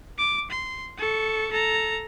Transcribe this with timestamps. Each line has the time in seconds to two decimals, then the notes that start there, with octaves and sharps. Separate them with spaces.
0.18 D6
0.50 C6
0.98 A4 C#6
1.51 A4 A#5